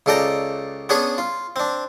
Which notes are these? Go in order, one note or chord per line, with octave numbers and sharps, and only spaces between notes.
C#2 C#3 A4 D5 G5 A#5
B3 C#4 D4 G#4 B4 C#5
F4
C4 D4